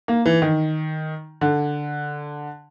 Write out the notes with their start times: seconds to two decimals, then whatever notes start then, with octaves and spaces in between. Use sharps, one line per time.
0.08 A#3
0.26 E3
0.42 D#3
1.41 D3